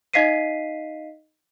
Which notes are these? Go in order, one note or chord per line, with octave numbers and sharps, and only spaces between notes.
D#4 D#5 F5 B6 C7 D#7